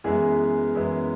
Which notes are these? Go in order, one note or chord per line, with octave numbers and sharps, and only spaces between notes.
F#2 E3 G#3 B3 G#4
F#2 E3 G#3 B3